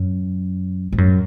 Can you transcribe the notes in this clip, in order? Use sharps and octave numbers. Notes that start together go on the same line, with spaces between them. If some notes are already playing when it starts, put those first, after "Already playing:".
Already playing: F#2
G#2
F#2